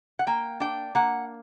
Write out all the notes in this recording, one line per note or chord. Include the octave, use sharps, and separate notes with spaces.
F#5
A#3 G5
D4 G5
A#3 F#5